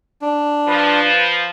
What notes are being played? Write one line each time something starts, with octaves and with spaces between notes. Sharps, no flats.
D4
F3 B4